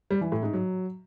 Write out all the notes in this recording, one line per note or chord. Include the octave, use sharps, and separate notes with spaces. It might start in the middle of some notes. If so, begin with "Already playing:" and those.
G3
E3
A2
G#2
F#3